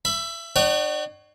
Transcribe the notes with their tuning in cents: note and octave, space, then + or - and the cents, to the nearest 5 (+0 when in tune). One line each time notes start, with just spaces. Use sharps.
E5 +25 B5 +10
D4 +45 C#5 +0 F#5 +45